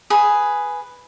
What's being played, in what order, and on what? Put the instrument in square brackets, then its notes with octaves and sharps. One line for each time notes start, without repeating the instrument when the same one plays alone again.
[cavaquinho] G#4 B4